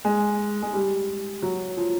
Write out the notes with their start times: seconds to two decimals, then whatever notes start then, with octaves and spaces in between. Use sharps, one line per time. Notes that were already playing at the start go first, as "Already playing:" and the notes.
0.05 G#3
0.62 G#3
0.73 G3
1.42 F#3
1.77 F3